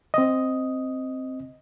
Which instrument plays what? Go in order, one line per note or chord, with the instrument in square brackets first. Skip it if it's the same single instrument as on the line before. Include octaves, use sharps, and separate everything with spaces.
[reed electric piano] C4 D#5